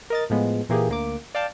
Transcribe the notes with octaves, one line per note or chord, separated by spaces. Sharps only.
A#4 D#5 A6
A2 F3 G#3 B3
A#2 E3 A#3 G4 G#4
D2 A#3 D6
D5 F5 G5 A5